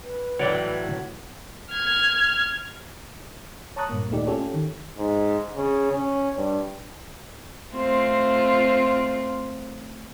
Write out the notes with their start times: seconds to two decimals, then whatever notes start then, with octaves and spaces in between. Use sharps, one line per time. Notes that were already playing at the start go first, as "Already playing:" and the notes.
0.03 B4
0.39 A2 E3 F#3 C#5 D5 G5
1.72 F6 G#6
3.76 C#5 A5 A#5 C#6 D#6 F#6
3.89 G2 A#2 A#3
4.10 D#2 A#2 A3 D#4 G4 D5
4.27 C#4 F4 G4 A4 C#5
4.54 D#3
4.98 G#2
5.55 C#3
5.91 C#4
6.37 G2
7.75 A3 C4 F4